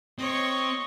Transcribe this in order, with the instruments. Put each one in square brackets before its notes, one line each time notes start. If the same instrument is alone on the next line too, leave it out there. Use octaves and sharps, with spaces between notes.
[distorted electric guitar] C4 [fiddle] C#5 [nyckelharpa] D#5 C#6